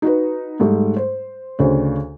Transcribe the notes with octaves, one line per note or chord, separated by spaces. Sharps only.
D#4 F#4 B4
G#2 G3 A3
C5
D2 C#3 C5